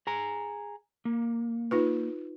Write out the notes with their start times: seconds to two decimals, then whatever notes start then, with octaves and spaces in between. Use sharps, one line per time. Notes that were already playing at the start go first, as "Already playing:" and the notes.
0.07 G#4 A#5
1.05 A#3
1.71 D#4 F4 B4